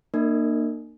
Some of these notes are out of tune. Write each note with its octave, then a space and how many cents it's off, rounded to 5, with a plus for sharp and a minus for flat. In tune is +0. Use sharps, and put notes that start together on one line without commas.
A#3 +0 D4 +45 A#4 -35